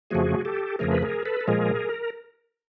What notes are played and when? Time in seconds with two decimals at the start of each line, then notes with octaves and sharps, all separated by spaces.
0.10 F2 C#3 F3 A3 F#4 G#4
0.45 G4 A4
0.79 F2 C#3 F3 A3 G#4 A#4
0.92 B4
1.02 G#4 A#4
1.26 A4 B4
1.41 A4
1.47 A#2 F3 G#3 G#4 A#4